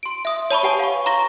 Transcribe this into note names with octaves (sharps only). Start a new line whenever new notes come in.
C6 D7
E5 D#6
C#5 A5 B5 C#6
G4 B4 F#5 G#5 A5
F5 C#6
A#5 C6 C#6 A#6